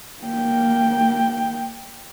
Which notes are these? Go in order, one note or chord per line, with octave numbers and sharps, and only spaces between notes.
A#3 G5